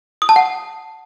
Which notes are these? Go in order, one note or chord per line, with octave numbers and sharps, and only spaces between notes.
D#6
A5
F#5